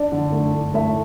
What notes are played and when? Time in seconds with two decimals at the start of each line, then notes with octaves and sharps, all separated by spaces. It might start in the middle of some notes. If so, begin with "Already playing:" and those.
Already playing: D4 D5
0.12 D3
0.32 A3
0.54 D4
0.74 A3 E5